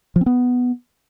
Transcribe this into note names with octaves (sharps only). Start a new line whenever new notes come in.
F3
C4
B3